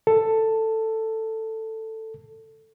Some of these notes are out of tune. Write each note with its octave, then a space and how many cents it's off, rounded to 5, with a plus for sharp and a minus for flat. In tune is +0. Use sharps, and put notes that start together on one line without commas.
A4 +10